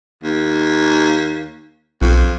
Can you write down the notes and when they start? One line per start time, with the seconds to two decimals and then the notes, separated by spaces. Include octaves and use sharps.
0.23 D#2
2.02 B1 F2